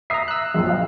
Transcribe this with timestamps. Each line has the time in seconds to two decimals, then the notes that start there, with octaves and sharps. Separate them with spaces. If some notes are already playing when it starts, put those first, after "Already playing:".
0.10 E5 A#5 D#6 C7
0.28 E6 F#6
0.54 A#1 F#2
0.69 F5